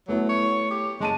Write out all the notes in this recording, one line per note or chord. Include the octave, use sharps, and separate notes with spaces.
F#3 A3 B3 E4
C#5
G4
F#1 G#3 A5 D#7